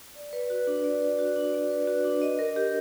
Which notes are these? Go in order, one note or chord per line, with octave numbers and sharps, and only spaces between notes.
D5
B4
F#4
D4
D5
B4
F#4
D4
D5
B4
F#4
D4
D#5
A#4
G4